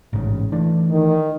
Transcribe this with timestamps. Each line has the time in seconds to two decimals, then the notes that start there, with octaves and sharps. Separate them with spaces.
0.13 A1 G#2 C#3
0.52 E3 A3 D4
0.90 D#3